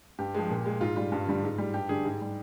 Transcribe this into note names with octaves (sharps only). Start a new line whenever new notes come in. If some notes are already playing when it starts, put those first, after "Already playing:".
G2 G4
F3 G#3
A#2
G#3
G#2 F4
G3 F4
G2
D3 G3
G#2
G3
G2 G4
D3 G3 G#4
G#2 G4
G3